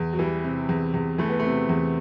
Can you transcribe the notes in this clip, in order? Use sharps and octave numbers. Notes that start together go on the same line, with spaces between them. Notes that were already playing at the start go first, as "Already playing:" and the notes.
Already playing: E2
F#3
E3 G3
C3
E2
E2
E3 A3
B3
C3 A3
E2